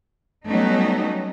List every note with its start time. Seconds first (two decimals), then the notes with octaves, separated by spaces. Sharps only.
0.48 F#3 G3 A3 B3 C#4 D#4